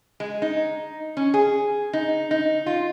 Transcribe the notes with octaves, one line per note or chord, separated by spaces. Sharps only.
G#3
D#4
C#4
G#4
D#4
D#4
F4